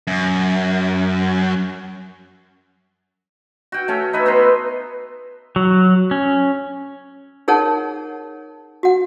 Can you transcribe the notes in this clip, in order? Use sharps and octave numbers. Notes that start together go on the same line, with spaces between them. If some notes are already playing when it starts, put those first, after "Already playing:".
F#2
F#4 G5
A3 C#4
D#4 B4 E5
B3 B4 A#5 C6
F#3
C#4
D#4 G#4 A#4 C#5 F#5 A5
F#4 F#5